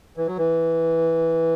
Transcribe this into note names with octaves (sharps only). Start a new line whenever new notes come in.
E3
F#3
E3